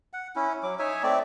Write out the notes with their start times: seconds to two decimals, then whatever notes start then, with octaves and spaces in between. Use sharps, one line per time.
0.13 F#5
0.36 C#4 E4
0.63 F#3 D6
0.79 D#4 C#5 E5 G#5
1.03 A3 C4 D5